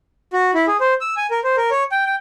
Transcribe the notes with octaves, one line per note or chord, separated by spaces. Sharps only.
F#4
E4
G#4
C5
E6
G#5
A#4
C5
A#4
C#5
G5
G5